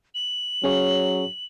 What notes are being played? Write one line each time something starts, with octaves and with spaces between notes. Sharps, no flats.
F#7
F#3 C#4 G#4 C#5